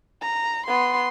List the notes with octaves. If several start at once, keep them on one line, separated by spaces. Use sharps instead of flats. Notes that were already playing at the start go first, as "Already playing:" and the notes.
A#5
B3 C6